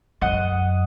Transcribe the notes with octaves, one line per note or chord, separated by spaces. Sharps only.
F#2 D#5 F#5